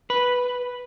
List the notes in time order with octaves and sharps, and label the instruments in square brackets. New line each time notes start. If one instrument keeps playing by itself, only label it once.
[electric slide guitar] B4